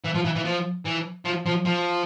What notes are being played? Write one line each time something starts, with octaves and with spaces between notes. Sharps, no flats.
E3
F3
E3
E3
F3
E3
F3
F3
F3